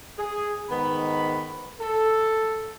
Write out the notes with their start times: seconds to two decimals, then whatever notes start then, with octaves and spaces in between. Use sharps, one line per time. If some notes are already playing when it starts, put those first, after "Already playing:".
0.19 G#4
0.70 G#2 D#3 B3 B5
1.80 A4